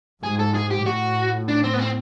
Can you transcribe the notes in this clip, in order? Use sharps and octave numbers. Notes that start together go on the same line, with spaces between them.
G#2 G#4
A4
G#4
G4
A2 F#4
D4
C4
B3
C4